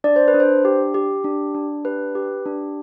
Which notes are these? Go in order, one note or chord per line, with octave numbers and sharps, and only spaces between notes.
D4 D5
C5
B4
D4
C5
G4
G4
D4
D4
G4 B4
G4
D4